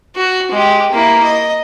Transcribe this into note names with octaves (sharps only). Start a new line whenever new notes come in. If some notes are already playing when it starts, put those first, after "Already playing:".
F#4
G#3 G4
A#3 E4
D#5